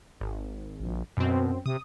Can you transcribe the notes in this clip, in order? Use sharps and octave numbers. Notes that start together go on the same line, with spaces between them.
G#1
A#1
F#2 B2 C4
C3 D#6